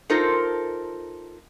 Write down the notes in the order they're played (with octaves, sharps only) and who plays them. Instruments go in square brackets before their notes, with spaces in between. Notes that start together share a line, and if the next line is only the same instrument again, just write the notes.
[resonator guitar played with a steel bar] D#4 F4 A4 A#4 C5